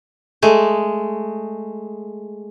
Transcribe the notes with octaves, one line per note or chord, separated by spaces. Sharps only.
G#3 A3